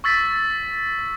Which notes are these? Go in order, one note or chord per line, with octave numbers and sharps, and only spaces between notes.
C#6 E6 A6 B6